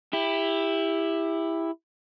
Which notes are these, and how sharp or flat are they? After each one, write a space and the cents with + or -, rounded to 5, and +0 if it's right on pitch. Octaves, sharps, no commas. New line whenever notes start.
E4 +0 G4 +25